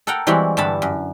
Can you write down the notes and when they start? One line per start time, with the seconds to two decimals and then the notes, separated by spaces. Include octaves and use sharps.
0.07 A4 A#4 F#5 G5 A#5
0.27 E3 G3 G#3 C4 F#4 G4
0.57 G2 D3 E3 A5 B5
0.82 F#2